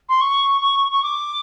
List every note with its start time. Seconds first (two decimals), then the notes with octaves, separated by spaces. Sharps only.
0.09 C6
0.21 C#6
0.62 C#6
0.92 C#6
1.03 D6